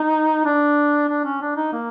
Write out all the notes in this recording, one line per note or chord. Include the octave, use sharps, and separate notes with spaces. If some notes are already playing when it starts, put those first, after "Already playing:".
Already playing: D#4
D4
D4
C#4
D4
D#4
A#3